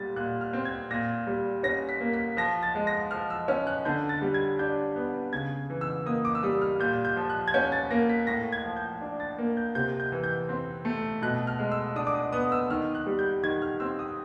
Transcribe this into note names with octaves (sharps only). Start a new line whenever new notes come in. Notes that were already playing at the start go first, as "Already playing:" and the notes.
Already playing: A#2 G3 A6
A#2 F#6
F6
C4
G#6
A#2 A#6
G3
C#4 A#6
B6
A#3
B6
F3 A#6
A6
G#3
A#6
F3 F6
E6
C#4 F6
F#6
D3 G6
A6
G3
G#6
D4 G6
B3
C#3 G#6
E3
E6
A#3 D#6
D6
E6
G3 D#6
F6
A#2 G6
G6
F3
F#6
G#6
C#4 G6
A6
A#3 A#6
B6
A2 A#6
G#6
F3
G6
D4
A6
A#3
G6
C3 G6
G6
E3
G6
C4
A3
B2 F#6
F6
G#3
E6
D4 D#6
D6
D#6
B3 D#6
E6
D#3 F6
F#6
G3
G6
D#3 G#6
F6
C4 E6
D#6